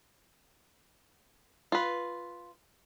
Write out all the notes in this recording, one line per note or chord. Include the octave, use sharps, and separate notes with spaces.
F4 B4